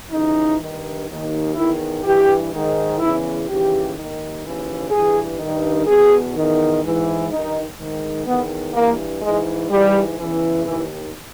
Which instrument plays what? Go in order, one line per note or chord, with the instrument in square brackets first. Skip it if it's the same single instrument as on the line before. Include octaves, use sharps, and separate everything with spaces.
[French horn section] D#2 C#3 E3 D#4
G2 D#3
D#2 D#3
E2 D#3 E4
G2 E3 G4
G#2 D#3
E2 C#3 E3 E4
D#2 C#3 E3 G4
D#2 D#3
D#2 C#3 E3
G2 E3 G#4
G2 D#3
E2 B2 G#4
E2 D#3
G#2 E3
G2 D#3 D#4
G#2 D#3
E2 D#3 B3
G2 E3 A#3
G#2 E3 G#3
G#2 E3 G3
E2 C#3 E3
D#2 D#3 E3